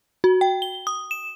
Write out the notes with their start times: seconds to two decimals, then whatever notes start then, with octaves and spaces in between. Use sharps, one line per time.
0.24 F#4
0.41 G5
0.62 G7
0.87 D#6
1.11 E7